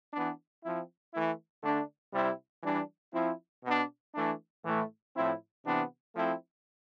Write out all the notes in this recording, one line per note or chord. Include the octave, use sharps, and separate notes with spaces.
E3 B3 D4
F3 C4 E4
E3 A3 E4
D3 A3 D4
C3 G3 C4 E4
E3 G3 D4
F3 C4 E4
B2 B3 D4
E3 A3 D4
A2 E3 A3 E4
A2 F3 C4 E4
C3 E3 B3 D4
F3 A3 C4 E4